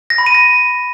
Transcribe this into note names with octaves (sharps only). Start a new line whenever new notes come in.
A#6
B5
D#7
A#6